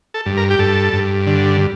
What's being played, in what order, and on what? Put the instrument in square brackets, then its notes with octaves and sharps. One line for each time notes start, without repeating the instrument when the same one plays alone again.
[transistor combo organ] A4
G2
A#4
G4
G2 A4
G2
D3